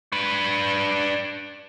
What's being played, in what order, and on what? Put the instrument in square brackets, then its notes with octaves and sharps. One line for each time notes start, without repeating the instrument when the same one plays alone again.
[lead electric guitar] D4 B4